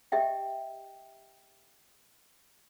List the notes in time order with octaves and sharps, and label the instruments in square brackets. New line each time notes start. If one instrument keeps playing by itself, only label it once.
[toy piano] G4 D#5 E5 G5